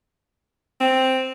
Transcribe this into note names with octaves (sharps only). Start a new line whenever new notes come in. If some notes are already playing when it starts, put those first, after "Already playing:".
C4